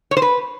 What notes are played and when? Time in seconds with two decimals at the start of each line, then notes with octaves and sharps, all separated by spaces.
0.11 C#5
0.17 C5
0.22 B4